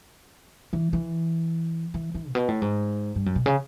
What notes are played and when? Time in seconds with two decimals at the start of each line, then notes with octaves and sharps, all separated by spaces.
0.73 E3
0.93 E3
1.94 E3
2.14 E3
2.29 A#2
2.35 B2
2.48 A2
2.62 G#2
3.15 G2
3.26 F#2
3.36 B2
3.46 C#3